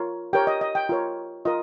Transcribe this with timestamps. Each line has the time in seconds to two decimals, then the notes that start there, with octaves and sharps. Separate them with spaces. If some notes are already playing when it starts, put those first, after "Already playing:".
Already playing: F4 A#4 C#5
0.33 G4 A#4 C#5 G5
0.47 D#5
0.61 D#5
0.75 G5
0.89 F4 A#4 C#5
1.45 F4 A#4 D#5